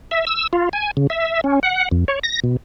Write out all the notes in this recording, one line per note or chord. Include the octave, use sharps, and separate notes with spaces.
E5
E6
F4
G#5
C#3
E5
C#4
F#5
F2
C#5
A#6
B2